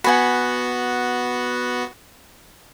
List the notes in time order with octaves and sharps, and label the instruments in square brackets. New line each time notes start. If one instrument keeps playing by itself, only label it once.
[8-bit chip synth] B3 F#4 [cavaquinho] F#5 G#5 B5